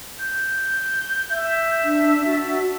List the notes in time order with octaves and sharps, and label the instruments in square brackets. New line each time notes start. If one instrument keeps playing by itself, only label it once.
[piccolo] G6
[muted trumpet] E5
[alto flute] D4
[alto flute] F#4 [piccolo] A5